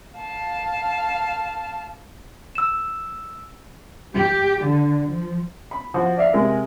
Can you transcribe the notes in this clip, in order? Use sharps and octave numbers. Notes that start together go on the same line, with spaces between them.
F5 A5
E6 E7
G4
D3
F3
B5
F3 F#4
D5 E5 F5
C3 G#3 A#4